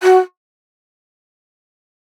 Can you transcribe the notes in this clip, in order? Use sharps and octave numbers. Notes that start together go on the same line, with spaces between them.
F#4